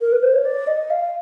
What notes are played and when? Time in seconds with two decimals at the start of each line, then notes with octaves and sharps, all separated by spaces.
0.01 A#4
0.12 B4
0.23 C5
0.33 C#5
0.45 D5
0.67 D#5
0.90 F5